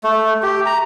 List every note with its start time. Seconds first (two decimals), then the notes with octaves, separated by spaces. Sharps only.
0.04 A3
0.43 G4
0.66 A#5